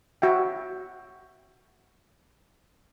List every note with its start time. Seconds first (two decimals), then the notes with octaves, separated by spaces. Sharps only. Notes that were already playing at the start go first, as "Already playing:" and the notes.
0.22 F#4 E5 G5